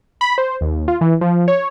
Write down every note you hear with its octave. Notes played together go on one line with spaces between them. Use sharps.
B5
C5
D#2
F4
E3
F3
C#5